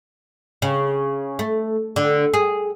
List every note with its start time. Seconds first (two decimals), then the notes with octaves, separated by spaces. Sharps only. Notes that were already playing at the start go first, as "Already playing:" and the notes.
0.62 C#3
1.39 A3
1.96 D3
2.34 G#4